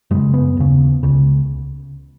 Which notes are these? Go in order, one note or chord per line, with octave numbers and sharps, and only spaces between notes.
F#2 C#3 G#3
B3
D#2 C#3
C#2 C#3